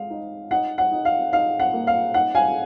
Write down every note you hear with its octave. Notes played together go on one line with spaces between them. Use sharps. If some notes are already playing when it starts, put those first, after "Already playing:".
Already playing: G#3 F5
D#4
D#4 F#5
F#5
D#4
F5
D#4 F5
F#5
A#3
F5
D#4 F#5
F5 G#5